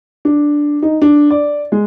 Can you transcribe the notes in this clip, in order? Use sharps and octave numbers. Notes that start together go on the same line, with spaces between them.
D4
D#4
D4
D5
G#3